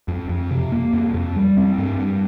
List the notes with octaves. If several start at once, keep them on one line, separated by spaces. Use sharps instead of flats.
F2
F2
C3
A#3
F2
F2
G3
C4
G2
G2